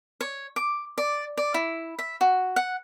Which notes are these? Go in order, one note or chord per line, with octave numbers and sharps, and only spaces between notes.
C#5
D6
D5
D5
E4
E5
F#4
F#5